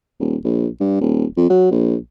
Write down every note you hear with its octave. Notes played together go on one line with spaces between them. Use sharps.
D#1
A#1
G2
D#1
F2
F#3
A#1